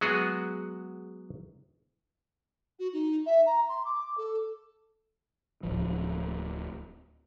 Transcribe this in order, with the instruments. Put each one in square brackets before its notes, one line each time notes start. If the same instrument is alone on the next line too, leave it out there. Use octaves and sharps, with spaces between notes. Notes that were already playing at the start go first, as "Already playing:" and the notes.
[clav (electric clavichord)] F#3 G#3 B3 F#4 G#4
[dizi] F#4
D#4
E5
A#5
C6
D6
A4
[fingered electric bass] D1 C#2 F3